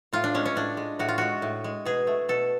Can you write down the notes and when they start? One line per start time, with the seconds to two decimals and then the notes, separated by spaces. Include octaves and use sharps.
0.13 A2 F4
0.24 D4
0.34 G#3 C#4
0.46 C#4
0.56 A2 D4
0.77 G#3
0.99 A2 F#4
1.09 F4
1.18 G#3 F#4
1.42 A2
1.64 G#3
1.85 B2 G#4
2.07 A3
2.29 B2 A4